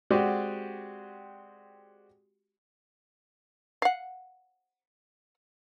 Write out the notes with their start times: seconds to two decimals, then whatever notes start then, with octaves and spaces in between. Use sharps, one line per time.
0.10 G#3 C4 F#4 G4 D5 F#5
3.82 F5 F#5